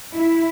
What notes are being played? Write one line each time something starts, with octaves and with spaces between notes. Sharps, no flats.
E4